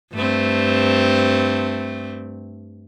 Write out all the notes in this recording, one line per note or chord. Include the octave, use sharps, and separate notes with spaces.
G2 A3 C4